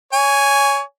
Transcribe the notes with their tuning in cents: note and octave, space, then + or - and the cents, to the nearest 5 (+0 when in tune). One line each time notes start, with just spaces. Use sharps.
C#5 +20 G#5 +0